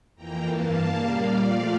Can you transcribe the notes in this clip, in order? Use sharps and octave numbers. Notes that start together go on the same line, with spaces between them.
F2 E3 A#3 G5 A#5
G2 E3 A#3 F5 A5
C#3 G3 A#3
A#2 G3 A#3 D5 F5
A#2 F3 A3